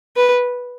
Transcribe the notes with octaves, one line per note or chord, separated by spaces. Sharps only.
B4